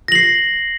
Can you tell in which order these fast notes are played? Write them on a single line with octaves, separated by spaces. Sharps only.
A#6 F#7 C7